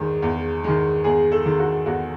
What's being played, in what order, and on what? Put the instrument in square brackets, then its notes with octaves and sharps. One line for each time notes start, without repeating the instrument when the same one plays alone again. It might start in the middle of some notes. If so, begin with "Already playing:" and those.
Already playing: [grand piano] E2 D#3 G#3
E2
D#3 G#3
E2 G#4
A4
D#3 G#3
F#4
E2 F#4